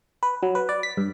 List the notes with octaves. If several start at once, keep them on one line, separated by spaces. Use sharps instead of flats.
B4
F#3
B4
D5
B6
G2